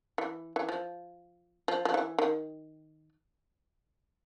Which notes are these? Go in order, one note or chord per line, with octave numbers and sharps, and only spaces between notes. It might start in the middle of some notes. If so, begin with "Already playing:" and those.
E3
E3
F3
F3
F3
E3
D#3